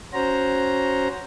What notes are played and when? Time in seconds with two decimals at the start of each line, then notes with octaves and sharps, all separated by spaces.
0.13 C#4 F#4 C5 A#5